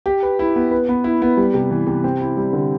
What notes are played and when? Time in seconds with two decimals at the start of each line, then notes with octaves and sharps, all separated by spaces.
0.06 G4
0.23 B4
0.39 E4
0.56 B3
0.71 B4
0.89 B3
1.04 E4
1.22 B3
1.37 G3
1.54 C3
1.71 E3
1.87 C3
2.04 C4
2.21 E4
2.37 G3
2.53 D3